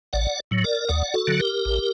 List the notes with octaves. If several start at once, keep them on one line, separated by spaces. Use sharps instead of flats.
A1 D5 F#5
A2 F#3
A#4 D5
D#2 D5 F#5
F#4 A4
D3 F#3
G4 A#4
A1